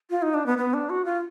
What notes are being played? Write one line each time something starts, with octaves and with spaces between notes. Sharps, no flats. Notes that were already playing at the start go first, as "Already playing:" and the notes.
F4
D#4
D4
B3
B3
D4
F#4
F4